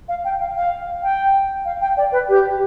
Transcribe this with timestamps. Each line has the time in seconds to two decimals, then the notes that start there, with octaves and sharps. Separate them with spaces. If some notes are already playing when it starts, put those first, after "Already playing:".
0.08 F5
0.24 G5
0.39 F5
0.55 F5
1.02 G5
1.65 F5
1.81 G5
1.97 D5
2.12 B4
2.28 G4